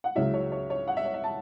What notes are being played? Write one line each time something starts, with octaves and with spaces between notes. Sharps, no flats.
F#5
C#2 C#3 F#3 C#4 E4 E5
C#5
C#5
C#5
F#5
E5
C#5
E5
A5